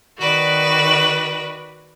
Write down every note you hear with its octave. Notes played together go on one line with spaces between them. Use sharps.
D#3 F#4 B4 D5